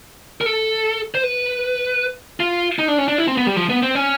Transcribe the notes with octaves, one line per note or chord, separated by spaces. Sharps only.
A#4
A4
C5
B4
F4
D#4
D4
C#4
D4
E4
C4
B3
G3
F3
B3
C4
C#4